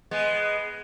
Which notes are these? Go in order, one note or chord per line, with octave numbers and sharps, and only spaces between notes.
G#3 B3